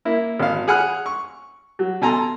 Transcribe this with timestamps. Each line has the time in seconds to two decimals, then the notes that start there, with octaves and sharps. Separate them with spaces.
0.05 A#3 E4
0.39 G#1 F5
0.68 G#4 F#5 G#5 B5 F6 F#6
1.06 C#6
1.79 F#3
2.01 B2 A4 G#5 A#5 C6